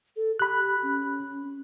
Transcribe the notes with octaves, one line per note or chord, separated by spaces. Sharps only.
A4
G4 B5 F#6
C#4